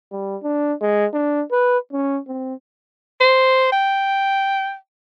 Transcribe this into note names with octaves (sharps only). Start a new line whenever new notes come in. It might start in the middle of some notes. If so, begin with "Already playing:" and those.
G3
D4
G#3
D4
B4
C#4
C4
C5
G5